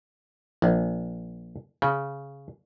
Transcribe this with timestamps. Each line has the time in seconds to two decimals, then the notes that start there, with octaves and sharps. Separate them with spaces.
0.62 A#1
1.82 C#3